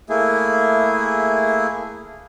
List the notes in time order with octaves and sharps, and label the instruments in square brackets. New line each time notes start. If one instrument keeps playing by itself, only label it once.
[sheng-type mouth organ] A3 A#3 E4 G#4